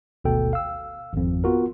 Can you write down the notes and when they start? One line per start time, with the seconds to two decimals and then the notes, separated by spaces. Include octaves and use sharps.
0.24 G#1 D2 B2 A4 G5
0.53 F5 E6
1.13 G#1 F2
1.44 B3 F4 F#4 A#4